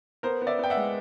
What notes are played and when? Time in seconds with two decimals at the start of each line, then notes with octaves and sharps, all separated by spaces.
0.23 B3 A#4 C5
0.42 B3
0.47 D5 E5
0.59 B3 G5
0.70 E5 F#5
0.77 G#3